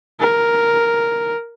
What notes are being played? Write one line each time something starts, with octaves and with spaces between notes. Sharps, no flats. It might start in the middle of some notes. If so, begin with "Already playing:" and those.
A#4